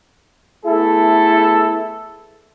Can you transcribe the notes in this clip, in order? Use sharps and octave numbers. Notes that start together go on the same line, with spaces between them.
A3 B3 E4 G#4 A4